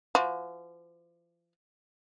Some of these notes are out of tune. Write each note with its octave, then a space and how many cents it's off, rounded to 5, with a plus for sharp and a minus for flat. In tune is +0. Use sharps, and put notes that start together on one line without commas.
F3 -35 F#4 -40